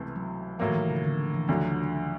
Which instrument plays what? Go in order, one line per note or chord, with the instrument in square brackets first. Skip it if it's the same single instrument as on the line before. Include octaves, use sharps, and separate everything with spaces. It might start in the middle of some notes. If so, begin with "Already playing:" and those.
Already playing: [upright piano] C#2 C3 E3 A3
[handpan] F#3
[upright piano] A2 F#3 A#3 [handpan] F3
[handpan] D#3
E3
C#3
D3
E3
[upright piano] D2 D3 F#3 [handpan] F3